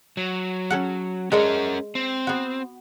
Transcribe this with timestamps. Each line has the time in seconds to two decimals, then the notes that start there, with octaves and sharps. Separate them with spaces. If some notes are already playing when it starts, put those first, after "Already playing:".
0.17 F#3
0.70 C#4 A4 F#5
1.32 G#3 C#4 A4 A#4 D5
1.95 C4
2.27 B3 F#4